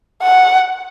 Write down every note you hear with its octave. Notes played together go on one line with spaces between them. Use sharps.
F#5